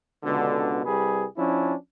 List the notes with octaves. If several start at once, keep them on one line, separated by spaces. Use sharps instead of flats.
C#2 B2 D3
C2 G3 G#4 B4
F3 C#4 D4 E4